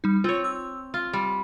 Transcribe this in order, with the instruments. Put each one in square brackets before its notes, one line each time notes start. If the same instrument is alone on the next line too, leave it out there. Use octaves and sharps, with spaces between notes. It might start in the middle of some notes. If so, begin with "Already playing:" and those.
[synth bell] G3 D#4
[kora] C4 C#5 [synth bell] F4
[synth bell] E6
[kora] F4
G3